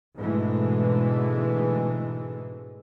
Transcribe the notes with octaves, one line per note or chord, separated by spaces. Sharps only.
G#2 B2 D3 E3 G#3 A3